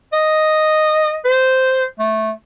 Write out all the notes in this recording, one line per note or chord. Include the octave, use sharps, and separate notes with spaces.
D#5
C5
A3